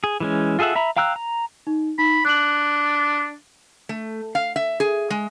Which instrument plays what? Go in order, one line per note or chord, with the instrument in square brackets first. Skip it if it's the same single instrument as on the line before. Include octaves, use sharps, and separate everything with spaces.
[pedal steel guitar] G#4
E3 G#3 C#4
F4 G#4 A4 E5 F#5
E5 A#5 B5
F5 G5 A#5 E6 F#6
A#5
[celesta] D#4
[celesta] D#4 [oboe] B5
[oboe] D4 [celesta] F#6 F#7
[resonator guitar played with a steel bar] A3
F5
E5
G#4
G#3